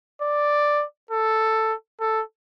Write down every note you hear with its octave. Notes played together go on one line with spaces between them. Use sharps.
D5
A4
A4